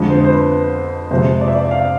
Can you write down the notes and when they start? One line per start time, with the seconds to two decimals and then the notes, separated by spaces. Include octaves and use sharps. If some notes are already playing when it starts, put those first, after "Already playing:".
Already playing: F2 D3 G#3
0.10 C5
0.24 C5
0.30 B4
1.11 F2 C3 G#3 C5
1.41 D5
1.48 E5
1.55 D5
1.71 F5